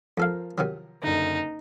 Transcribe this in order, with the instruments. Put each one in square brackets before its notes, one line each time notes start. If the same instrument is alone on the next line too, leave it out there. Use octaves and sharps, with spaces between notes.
[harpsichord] F2 A4 F5 [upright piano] F3 A#4
[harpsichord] C3 D#3 F#3
[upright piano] F#1 D3 [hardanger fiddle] D#4